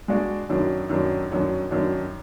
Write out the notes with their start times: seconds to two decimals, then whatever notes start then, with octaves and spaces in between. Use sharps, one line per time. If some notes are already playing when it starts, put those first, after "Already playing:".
0.08 G#3 D4 F#4 D5
0.49 F#2 D#3 F#3 D4
0.89 F#2 D#3 F#3 D4
1.30 F#2 D#3 F#3 D4
1.71 F#2 D#3 F#3 D4